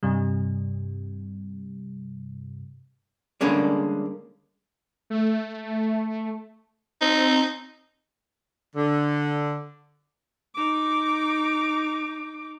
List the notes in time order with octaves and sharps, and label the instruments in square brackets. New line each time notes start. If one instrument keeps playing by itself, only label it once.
[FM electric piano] G2 C3 G3
[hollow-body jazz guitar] D3 G3 G#3 A#3 C#4 D4
[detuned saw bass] A3
[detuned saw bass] C4 [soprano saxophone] D#4
[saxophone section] D3
[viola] D#4 D6